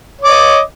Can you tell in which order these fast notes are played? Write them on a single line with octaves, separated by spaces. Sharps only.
C#5 D6 D#5